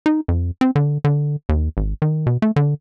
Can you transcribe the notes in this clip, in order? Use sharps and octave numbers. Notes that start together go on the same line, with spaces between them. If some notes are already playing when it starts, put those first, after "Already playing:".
D#4
F2
C4
D3
D3
D#2
G#1
D#3
B2
A3
D3